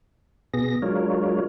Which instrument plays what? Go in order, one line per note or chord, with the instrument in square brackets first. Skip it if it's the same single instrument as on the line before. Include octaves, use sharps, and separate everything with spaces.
[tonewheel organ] B2 B3 G#4 A#6
F#3 G#3 D4 F4 A#4 C#5